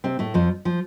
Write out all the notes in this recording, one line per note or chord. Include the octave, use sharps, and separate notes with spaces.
C3 C4
A2 A3
F2 F3
F3